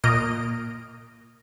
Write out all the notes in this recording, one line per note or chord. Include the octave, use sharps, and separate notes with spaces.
A#2 A#3 D#5 F6 D7